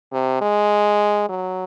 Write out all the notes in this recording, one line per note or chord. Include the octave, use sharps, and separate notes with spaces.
C3
G#3
F#3